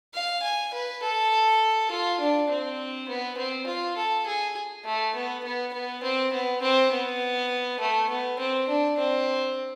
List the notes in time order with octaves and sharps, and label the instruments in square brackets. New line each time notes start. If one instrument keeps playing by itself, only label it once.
[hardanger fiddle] F5
G#5
B4
A4
F4
D4
C4
B3
C4
F4
A4
G#4
A3
B3
B3
B3
C4
B3
C4
B3
A3
B3
C4
D4
C4